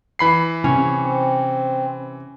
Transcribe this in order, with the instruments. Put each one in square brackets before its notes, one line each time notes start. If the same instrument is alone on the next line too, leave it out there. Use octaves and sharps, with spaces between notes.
[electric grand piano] E3 B5 C7
[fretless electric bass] C3 [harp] C#4
[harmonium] C4